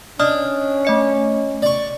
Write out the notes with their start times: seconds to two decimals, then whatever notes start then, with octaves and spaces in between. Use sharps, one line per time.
0.20 C#4 D4 D#5 D#6 F6
0.85 A3 D#5 C#7
1.62 D5 C#6